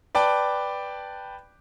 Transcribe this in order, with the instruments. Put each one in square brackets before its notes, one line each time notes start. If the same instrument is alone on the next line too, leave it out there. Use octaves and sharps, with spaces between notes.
[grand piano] B4 D5 G5 A5